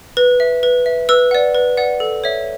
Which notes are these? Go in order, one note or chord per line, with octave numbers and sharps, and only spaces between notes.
B4
E5
B4
E5
B4 E6
D5 F#5
B4
D5 F#5
A4
C#5 E5